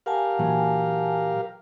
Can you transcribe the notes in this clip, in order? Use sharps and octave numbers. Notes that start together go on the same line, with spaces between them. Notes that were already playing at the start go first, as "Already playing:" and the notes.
G4 A#4 F5 F#5 G#5 A5
A#2 E3 F#3